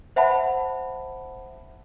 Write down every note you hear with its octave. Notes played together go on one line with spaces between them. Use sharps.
C5 E5 F#5 A5 B5